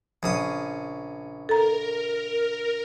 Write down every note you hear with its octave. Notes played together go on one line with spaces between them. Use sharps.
A#1 C#3 D#6
A4 A#4 A#5